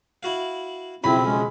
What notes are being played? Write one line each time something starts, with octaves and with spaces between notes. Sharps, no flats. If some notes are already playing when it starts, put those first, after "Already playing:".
E4 F#4 F5
B1 F2 C#3 C4 E4 B5
G#3 C#4